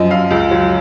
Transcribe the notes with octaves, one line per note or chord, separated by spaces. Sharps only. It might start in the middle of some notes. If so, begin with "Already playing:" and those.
Already playing: F#2 F3 D#5
F#2 F5
C#2
F#3